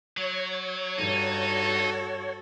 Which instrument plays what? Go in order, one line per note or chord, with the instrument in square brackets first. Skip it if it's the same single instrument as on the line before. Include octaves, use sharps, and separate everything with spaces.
[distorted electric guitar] F#3 [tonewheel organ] C#5
[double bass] G2 [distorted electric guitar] D#4 [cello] F#4 A4